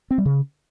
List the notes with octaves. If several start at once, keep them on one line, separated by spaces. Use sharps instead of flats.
C4
G3
C#3